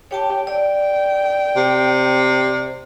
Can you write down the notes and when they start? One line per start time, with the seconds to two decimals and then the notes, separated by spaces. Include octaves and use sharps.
0.11 G4 C#5 G5 A5
0.47 D5 G5
1.56 C3